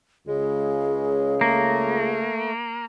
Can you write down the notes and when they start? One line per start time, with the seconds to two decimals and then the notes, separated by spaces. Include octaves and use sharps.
0.27 C#2 C#3 G#3 G#4
1.41 A3 A#3